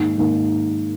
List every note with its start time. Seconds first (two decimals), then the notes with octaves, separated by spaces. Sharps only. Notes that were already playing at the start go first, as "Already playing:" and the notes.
Already playing: G#2 D#3 A#3 D#4
0.18 G#2 D#3 A#3 D#4